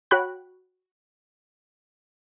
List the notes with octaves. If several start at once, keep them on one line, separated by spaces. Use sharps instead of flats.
F#4 C#5 G5 B5 F#6